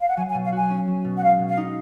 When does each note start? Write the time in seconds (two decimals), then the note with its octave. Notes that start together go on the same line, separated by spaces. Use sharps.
0.01 F5
0.09 F#5
0.17 F#3 G#5
0.30 G#5
0.34 B2
0.44 F5
0.52 F#4 G#5
0.70 C#4
0.88 F#3
1.05 B2
1.17 F#5
1.22 G#3 F5
1.39 B2
1.48 F5
1.57 D#4